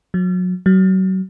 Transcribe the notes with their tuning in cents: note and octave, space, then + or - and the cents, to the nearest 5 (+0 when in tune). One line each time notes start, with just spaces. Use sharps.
F#3 -30
F#3 +30